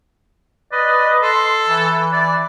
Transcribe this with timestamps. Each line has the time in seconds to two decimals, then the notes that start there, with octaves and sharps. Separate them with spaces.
0.72 B4 D5 D#5
1.22 A4 C6
1.68 E3
2.13 D5